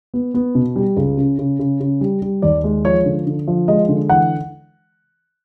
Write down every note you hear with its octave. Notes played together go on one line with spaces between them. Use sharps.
B3
B3
B2
G3
C#2
C#3
C#3
C#3
C#3
G3
G3
D#2 D5
G#3
F3 C#5
D3
D3
F3
G#3 D#5
D3
E3 F#5